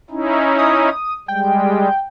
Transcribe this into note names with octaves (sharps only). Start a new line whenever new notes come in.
C#4 D#4 E4
D#6
G3 G#3 G5